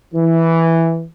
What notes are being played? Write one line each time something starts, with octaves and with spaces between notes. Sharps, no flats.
E3